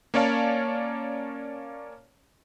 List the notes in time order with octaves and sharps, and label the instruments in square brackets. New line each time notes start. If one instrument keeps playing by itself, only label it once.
[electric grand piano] A#3 C#4 C#5 D5 F5 A5